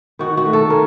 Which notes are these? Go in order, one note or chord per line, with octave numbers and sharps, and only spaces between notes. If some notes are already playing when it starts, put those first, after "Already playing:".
D#3 F#4
F#4
A3
A4
C#4 A#4